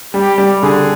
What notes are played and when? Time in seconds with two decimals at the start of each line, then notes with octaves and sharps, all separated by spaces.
0.14 G3 G4
0.38 G3
0.62 D3 G#4